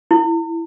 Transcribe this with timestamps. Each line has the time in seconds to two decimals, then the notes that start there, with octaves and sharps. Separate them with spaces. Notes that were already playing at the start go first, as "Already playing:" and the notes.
0.11 E4